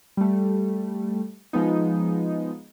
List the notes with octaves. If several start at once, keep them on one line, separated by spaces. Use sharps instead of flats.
G3 A3
F3 G#3 B3 D#4